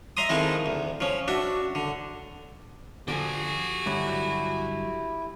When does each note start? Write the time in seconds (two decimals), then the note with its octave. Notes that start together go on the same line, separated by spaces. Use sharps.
0.17 D#5 E5 A#5 C6 D#6
0.29 D#3 F3 G#3 A3 C4 E4
0.66 D2
1.01 F3 C#4
1.28 D4 F#4 E5
1.75 D3
3.08 D3 F3 F#4 G4 A4 G#5
3.86 G2 D3 F#3 E4